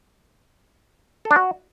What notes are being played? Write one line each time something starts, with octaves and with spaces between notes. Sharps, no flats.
A4
D4
F#4